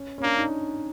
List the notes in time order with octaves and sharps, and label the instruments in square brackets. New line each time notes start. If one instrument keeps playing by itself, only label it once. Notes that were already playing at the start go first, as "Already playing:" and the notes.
Already playing: [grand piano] C#4
C#4
[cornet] A#3 [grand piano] D4
[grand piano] D#4